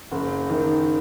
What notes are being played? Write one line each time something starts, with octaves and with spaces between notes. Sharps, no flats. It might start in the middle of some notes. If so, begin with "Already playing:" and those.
F#1
D#3